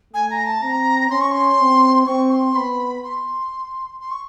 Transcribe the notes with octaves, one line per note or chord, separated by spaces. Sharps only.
A3 G#5
A#5
A5
C4 A#5
C#4 C6
C#6
C6
C4
C4 C#6
C6
B3 B5
C6
C6
C#6